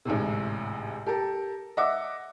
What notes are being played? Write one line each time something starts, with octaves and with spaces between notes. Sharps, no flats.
A1 D2 G#2 C3
G4 A4 A#4
D#5 E5 F#5 D6